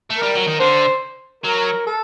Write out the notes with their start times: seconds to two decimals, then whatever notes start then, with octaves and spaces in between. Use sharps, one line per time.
0.10 A3
0.18 G3 A#4
0.35 F#3
0.47 D#3
0.60 D3 C5
1.44 F#3 A#4
1.87 A4